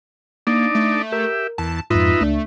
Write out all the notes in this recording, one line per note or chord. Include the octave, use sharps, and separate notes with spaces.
A#3 D4 D#4 D5
A3
G4 A#4 E5
E2 A5
F2 G#2 D#4 F4 B4 E5
C#2 A3 D4